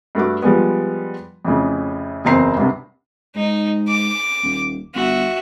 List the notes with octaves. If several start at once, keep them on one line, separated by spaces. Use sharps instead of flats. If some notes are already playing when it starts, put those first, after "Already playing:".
G2 A3 F#4 D6
F3 G3 G#3 B3
F2 A2 C#3
F#1 E2 C4 A#5 C7
C2 G2 C3
G#2 D#4
D6
D#1
G1 F#4 E5